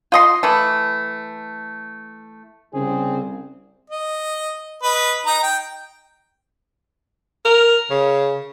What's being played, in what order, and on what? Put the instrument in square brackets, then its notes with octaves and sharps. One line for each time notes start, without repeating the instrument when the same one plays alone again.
[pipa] F4 D#5 C6
E3 A3
[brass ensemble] C2 [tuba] C#3 [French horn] C4 [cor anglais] G#4
[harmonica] D#5
B4 D#5
D#4 D#5 A#5
G5
[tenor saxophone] A#4
C#3